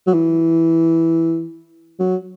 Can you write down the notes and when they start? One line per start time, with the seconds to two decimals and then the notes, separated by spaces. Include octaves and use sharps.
0.07 F#3
0.14 E3
1.99 F#3